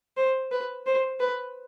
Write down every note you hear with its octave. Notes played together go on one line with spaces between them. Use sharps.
C5
B4
C5
B4